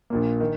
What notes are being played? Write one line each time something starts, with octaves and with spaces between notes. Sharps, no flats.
A#1 A#2 A#3
D#3